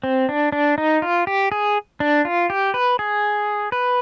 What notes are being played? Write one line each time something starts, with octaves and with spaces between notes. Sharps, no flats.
C4
D4
D4
D#4
F4
G4
G#4
D4
F4
G4
B4
G#4
B4